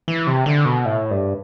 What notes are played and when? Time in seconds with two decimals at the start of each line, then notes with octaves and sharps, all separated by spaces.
0.08 E3
0.27 C3
0.46 D3
0.65 B2
0.85 A2
1.11 G2